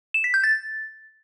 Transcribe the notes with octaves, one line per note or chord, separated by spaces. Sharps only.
E7
B6
G6
A6